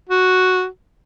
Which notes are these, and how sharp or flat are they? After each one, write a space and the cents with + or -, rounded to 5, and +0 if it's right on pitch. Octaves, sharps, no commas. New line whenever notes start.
F#4 -5